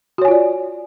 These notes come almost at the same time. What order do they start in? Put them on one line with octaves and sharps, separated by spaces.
F#4 C#5 G#5 F4 D5